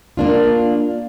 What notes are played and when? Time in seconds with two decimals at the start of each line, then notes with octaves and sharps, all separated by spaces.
0.17 A#3 D4 F4